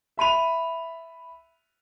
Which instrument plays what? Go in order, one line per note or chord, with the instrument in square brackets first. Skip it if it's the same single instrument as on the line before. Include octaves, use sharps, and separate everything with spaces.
[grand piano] E5 B5 D#7 F7